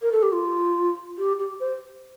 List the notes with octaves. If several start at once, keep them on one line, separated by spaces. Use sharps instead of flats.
A#4
A4
G4
F4
G4
G4
C5